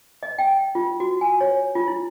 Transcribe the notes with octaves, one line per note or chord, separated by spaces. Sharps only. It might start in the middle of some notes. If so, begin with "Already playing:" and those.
D#5
G5
F4
F#4
G#5
C#5
F4
E4